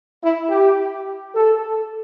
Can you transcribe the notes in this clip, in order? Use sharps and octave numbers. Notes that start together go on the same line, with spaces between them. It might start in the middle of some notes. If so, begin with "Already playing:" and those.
E4
G4
A4